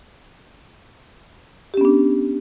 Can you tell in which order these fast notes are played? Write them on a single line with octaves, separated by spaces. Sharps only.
G4 C#4 B3 D4